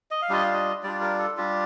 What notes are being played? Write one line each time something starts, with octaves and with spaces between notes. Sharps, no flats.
D#5
F5
G3 D4 F4 D#5
F5
D#5
G3 D4 F4 D5
A#4
A4
G3 D4 F4 G4